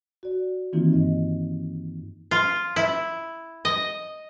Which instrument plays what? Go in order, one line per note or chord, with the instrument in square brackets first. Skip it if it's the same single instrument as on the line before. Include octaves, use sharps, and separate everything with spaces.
[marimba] F#4 D5
D#3 E3 A#3 C4 D#4 F4
G2 D#5
[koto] F4
E4
D#5